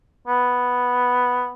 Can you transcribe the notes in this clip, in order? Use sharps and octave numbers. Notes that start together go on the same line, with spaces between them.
B3